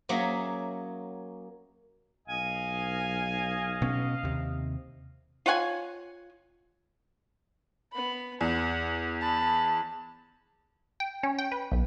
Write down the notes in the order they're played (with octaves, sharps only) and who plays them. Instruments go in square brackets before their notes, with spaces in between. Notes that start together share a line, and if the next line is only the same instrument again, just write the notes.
[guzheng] F#3 A#3 C#4 G#4 C#5 E5
[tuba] B1 [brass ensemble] D#5 F5 [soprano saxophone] G#5
[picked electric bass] B2 B3 C#4
D#2 C3
[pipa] F4 C#5 F#5 G#5
[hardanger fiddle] B3 B5
[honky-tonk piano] E2 [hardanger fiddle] F#5
[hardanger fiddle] A5 B5
[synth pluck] G5
C#4
G5
B4
B1